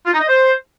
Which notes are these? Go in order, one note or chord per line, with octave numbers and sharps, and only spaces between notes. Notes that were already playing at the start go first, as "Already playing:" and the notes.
F4
D#4
D#5
C5